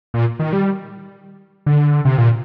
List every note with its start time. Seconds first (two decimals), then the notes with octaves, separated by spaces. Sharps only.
0.14 A#2
0.39 D#3
0.53 G3
1.66 D3
2.05 C3
2.18 A#2